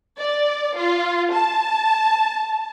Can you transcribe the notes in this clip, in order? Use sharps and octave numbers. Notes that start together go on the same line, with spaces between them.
D5
F4
A5